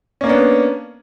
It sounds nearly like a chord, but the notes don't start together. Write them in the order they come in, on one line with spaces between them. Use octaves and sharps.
C#4 A#3 D4 B3